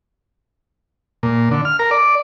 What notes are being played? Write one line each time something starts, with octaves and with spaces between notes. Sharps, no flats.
A#2
D3
F6
A#4
D5